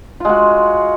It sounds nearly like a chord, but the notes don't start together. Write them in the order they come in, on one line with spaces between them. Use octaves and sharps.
F4 G#3 F#4